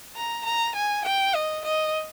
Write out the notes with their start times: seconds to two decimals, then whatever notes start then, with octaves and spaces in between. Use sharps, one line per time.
0.16 A#5
0.45 A#5
0.75 G#5
1.05 G5
1.35 D#5
1.65 D#5